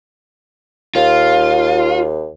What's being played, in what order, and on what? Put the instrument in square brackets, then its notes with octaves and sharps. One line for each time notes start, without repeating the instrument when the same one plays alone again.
[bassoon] D#2 [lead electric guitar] F4